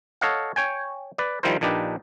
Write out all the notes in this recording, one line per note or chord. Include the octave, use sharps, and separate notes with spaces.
A4 C#5 D#5 F5 F#5
C#5 G5 G#5
B4 D5
D#3 F3 G3 E4 A#4 C5
A#1 A#2 D4 D#4 G4 B4